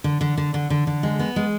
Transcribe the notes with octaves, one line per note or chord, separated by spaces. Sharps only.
D3
D3
D3
D3
D3
D3
G#3
B3
G#3